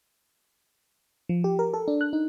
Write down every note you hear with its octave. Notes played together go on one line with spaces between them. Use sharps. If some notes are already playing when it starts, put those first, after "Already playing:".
F3
G4
A#4
A4
D4
F#6
D#4